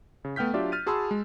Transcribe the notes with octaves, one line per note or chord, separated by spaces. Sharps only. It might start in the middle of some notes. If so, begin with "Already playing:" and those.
C#3
A3 B3 G5 F6 G6 B6
F#3 D4 F4 G4 D5 E5
F6 A6 D#7
F#4 G#4 A5 B5 C6 E6
G#3